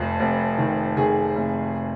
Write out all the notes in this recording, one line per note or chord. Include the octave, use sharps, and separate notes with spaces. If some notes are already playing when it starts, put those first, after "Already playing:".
Already playing: F1 F2
F1
D#3
D#3 G#4
F1